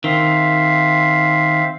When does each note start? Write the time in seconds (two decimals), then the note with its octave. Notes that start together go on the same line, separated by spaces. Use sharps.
0.04 D#3 C4 E5 F5